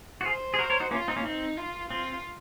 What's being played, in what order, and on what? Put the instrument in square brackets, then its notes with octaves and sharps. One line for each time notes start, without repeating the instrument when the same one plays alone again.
[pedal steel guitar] F#4
[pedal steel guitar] F4 G#4 [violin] C5
[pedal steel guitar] G#4
F#4 A#4
A#4 C#5
D#4 F#4
[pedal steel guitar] A#3 C#4 [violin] F4
[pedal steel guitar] C4 D#4
A#3 C#4
[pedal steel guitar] C4 [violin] D#4
[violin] F4
[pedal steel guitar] C4 [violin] F4